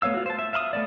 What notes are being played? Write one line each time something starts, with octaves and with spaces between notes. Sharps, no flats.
A3 B3 C#5 F5 E6
F4 F#4
C5 A5
E5
E5 F5 B5 D#6
A3 B3 D5